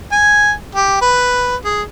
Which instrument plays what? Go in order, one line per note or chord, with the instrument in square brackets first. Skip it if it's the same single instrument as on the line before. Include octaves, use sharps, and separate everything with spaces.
[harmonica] G#5
G4
B4
G#4